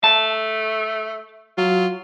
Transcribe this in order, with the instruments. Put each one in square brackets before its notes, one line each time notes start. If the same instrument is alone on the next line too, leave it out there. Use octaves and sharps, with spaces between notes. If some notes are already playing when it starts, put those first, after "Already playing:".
[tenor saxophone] A3 [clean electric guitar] A5
[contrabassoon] F#3 [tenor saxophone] F4